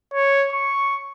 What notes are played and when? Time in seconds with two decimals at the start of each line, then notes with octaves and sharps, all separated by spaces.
0.14 C#5
0.53 C#6